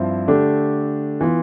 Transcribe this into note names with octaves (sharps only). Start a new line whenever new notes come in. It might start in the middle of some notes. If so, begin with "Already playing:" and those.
Already playing: G2 F3 C4 E4
D3 A3 D4 G4
E3 B3 F4